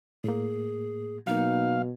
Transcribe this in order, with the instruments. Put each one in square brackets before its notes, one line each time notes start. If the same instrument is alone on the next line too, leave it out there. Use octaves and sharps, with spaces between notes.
[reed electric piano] A2 A#3 [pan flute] G#4
[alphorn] B2 [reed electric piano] F#3 A#3 [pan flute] D#4 [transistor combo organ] F5